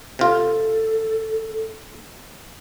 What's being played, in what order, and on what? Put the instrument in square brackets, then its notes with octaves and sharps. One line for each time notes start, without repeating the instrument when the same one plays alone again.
[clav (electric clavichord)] C3 F4 [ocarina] A4